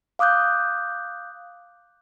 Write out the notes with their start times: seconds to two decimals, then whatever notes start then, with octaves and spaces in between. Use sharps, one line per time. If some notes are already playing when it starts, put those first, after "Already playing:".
0.19 F5 D6 D#6 F#6 G6